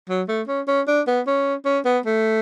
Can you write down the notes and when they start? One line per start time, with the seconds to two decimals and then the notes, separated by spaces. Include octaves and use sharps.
0.09 F#3
0.28 A3
0.48 C#4
0.68 C#4
0.87 D4
1.07 B3
1.27 C#4
1.65 C#4
1.85 B3
2.06 A3